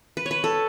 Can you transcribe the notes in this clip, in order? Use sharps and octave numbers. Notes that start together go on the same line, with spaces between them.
B4
C#5
B4
A4